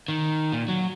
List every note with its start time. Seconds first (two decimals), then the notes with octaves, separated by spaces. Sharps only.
0.08 D#3
0.53 A#2
0.68 F#3